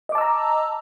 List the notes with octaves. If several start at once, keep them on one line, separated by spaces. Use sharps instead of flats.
D#5 A5 A#5 D6 E6